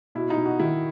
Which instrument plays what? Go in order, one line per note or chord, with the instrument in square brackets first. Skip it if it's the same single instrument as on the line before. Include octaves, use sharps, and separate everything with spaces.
[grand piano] B2 [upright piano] E4
[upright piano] D#4
[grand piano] B2
[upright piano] F#4
[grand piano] D#3 [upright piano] E4